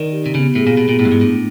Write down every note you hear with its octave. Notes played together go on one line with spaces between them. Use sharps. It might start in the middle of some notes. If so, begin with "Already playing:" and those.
Already playing: D#3 D#4 A#4 D5
G4
C3
C#3 B3
A2 G#4
A#2
B2 B3
A#2
A2 E4
G2
G#2
A2 D4